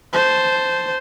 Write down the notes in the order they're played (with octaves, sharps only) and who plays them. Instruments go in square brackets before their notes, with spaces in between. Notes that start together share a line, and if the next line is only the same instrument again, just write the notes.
[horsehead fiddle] C5 A5